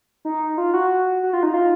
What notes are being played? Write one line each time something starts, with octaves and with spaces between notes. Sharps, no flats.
D#4
F4
F#4
F#4
F4
D#4
F4